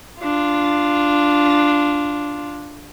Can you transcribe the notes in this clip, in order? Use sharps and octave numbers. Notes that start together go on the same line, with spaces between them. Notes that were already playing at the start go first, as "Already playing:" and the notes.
D4 F4